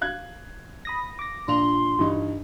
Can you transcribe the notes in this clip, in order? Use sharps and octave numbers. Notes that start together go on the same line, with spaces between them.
F5 F#6 G#6
B5 D#6 A#6
D6 A#6
A#1 D4 F4 C6 F7
G2 E3 D#4